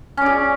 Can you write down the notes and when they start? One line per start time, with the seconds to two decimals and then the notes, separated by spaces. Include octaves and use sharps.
0.17 C#4
0.22 D5
0.26 G#4